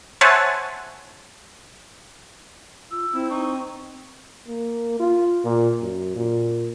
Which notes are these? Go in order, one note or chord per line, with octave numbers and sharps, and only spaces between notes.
C5 C#5 E5 F#5 G#5 A5
F4 E6
C4 E4
D#4 C#6
A#3
F4
A#2
F#2
A#2